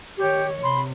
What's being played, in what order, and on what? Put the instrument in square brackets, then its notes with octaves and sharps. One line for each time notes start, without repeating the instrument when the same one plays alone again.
[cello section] D#3 C#5 [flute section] G4
[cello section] C3 [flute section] B5 C6